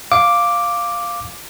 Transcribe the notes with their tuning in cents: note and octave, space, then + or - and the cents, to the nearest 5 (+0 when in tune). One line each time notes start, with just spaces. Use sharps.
F5 +0 D6 +0